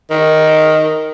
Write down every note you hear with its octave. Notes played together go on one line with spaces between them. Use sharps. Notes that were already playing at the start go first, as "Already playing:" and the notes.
D#3